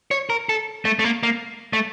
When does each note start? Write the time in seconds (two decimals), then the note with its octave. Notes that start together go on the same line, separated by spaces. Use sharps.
0.11 C#5
0.30 A#4
0.49 A4
0.85 A3
0.99 A3
1.04 A#3
1.23 A#3
1.73 A3